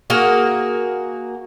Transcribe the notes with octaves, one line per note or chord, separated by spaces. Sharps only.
A#3 F#4 G#4